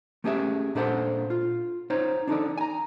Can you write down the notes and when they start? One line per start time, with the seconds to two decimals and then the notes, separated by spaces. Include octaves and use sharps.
0.24 A3 C#4 G4 G#4 D#5 E5
0.75 A#2 D4 A4 C5 F#5
1.30 F4
1.90 D#4 C5 C#5
2.27 D4 D#4 A4 D5
2.58 G#5 A#5